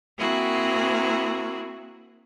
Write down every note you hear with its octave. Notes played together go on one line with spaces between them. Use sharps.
A#3 C4 E4 F#4 G#4